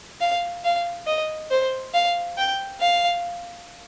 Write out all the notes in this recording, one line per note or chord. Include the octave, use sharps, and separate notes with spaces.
F5
F5
D#5
C5
F5
G5
F5